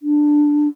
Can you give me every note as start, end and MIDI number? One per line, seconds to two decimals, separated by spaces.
0.02 0.68 62